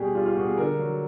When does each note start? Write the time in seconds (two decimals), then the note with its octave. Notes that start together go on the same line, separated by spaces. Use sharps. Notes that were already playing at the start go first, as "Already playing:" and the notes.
Already playing: B2 G3 G4 G#4
0.15 G3 F4
0.26 F4
0.36 B2 F#4
0.47 G#4
0.58 D3 A#4
0.79 F#3